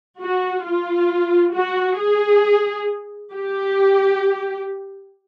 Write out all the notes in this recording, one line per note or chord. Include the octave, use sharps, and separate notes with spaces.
F#4
F4
F#4
G#4
G4